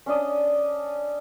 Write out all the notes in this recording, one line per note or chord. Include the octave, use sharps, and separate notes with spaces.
C#4 D4 D#5